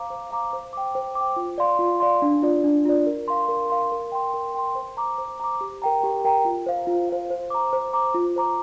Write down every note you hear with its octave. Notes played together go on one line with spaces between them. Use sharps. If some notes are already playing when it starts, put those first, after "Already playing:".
Already playing: C5 F5 A#5 D6
C5
F5 A#5 D6
C5
G5 D6
C5
D6
G5
F4
D5 F5 C6
F4
D5 F5 C6
D4
F4 D5
D4
F4 D5
A#4
F5 C6
A#4
F5 C6
A#4
G5 C6
A#4
G5 C6
C5
A#5 D6
C5
A#5 D6
G4
A#4 G5 A#5
G4
A#4 G5 A#5
F4
C5 F5
F4
C5 F5
C5
A#5 D6
C5
A#5 D6
F4
C5 A#5 D6